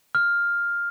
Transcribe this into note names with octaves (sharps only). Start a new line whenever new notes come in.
F6